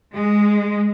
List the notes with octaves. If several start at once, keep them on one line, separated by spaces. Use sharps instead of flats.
G#3